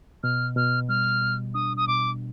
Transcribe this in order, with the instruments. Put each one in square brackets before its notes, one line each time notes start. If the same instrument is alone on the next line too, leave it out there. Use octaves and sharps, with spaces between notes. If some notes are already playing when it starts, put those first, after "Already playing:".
[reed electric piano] B2 [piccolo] F6
[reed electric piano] B2 [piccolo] F6
[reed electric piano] G3 [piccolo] F6
[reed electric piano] B2
[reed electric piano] D4 [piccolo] D#6
[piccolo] D#6
[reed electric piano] B2 [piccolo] D6